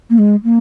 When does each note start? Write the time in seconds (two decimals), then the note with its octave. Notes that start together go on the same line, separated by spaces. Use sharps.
0.10 A#3
0.18 G#3
0.44 A#3